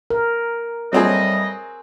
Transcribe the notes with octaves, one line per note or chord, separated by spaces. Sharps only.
A#4
A2 F#3 G3 C4 G#4 D#5